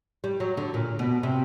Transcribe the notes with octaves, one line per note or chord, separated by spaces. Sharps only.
G3
F#3
D3
A#2
B2
C3